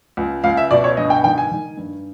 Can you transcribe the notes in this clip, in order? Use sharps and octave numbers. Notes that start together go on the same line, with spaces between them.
C#2
C#2 F5
E5
B2 D5
C#5
G2 D#5
G5
D#3 G5
G#5
D#3
G2